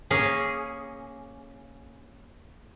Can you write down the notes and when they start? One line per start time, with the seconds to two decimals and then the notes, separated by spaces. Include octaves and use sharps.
0.11 A#3 C#4 G#4